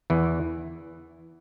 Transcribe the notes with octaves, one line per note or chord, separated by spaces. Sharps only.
E2 E3